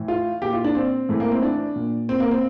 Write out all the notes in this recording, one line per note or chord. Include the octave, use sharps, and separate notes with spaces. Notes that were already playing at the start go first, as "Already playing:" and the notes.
Already playing: A2 E3
F4
A#2 G4
F4
D4
C4
A2 E3 A3
A#3
C4
D4
A#2
C4
A#3
C4